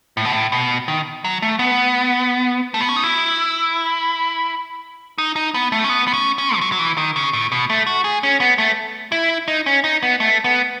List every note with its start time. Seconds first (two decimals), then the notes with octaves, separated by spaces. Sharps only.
0.17 A2
0.25 B2
0.32 A2
0.52 B2
0.88 D#3
1.24 F#3
1.42 A3
1.59 B3
2.74 A3
2.81 B3
2.89 C#4
2.96 D#4
3.04 E4
5.18 D#4
5.36 D#4
5.54 B3
5.72 A3
5.84 C#4
5.89 B3
6.07 B3
6.13 C#4
6.38 C#4
6.57 E3
6.61 F#3
6.72 F#3
6.79 E3
6.97 D#3
7.16 C#3
7.33 A2
7.52 B2
7.70 A3
7.87 F#4
8.04 G#4
8.23 C#4
8.40 B3
8.58 A3
9.12 E4
9.48 D#4
9.66 C#4
9.84 D#4
10.03 B3
10.20 A3
10.44 B3